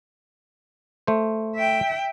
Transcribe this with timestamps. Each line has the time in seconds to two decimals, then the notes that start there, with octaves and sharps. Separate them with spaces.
1.07 A3 C5
1.56 E5 G5